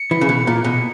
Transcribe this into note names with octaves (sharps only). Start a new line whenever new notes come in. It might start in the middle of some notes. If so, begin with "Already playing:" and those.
Already playing: C#7
E3
C#3
B2
A#2
B2